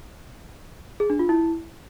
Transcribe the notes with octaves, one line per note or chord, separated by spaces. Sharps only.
G#4
D4
F4
E4